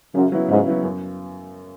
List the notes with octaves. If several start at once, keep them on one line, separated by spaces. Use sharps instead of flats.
F#2 C#3
F#3 B3 E4
G#2 C#3
F#3 B3 E4
F#2